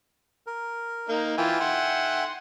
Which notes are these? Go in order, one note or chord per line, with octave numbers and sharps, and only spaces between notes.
A#4
A#3 D#4
E3 F4 E5 G5 G#5
F#5 C6